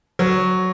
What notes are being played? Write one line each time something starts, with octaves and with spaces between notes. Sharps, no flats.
F#3